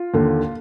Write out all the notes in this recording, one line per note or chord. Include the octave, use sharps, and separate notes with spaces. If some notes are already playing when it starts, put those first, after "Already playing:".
Already playing: F4
D#2 D3